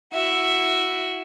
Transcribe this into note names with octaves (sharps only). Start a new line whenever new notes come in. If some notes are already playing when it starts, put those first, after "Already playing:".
E4 F#4 E5